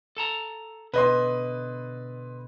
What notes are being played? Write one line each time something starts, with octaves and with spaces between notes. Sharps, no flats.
A4 A5 A#5
B2 D3 B4 D#5 C6